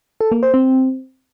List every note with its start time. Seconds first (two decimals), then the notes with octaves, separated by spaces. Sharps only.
0.21 A4
0.32 A#3
0.43 C5
0.54 C4